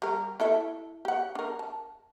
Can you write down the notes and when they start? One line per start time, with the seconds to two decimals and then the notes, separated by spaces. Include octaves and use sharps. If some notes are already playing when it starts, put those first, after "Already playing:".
0.02 G3 A#4
0.40 E4 A4 E5
1.05 G4 F#5
1.35 D4 A#4
1.59 A5